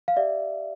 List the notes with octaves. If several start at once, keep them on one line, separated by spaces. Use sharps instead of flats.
F5
G4 D5 E5